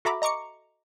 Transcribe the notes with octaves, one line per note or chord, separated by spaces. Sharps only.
F#4 A4 E5 A#5 B5 D6
D#5 A#5 C#6 D6 C#7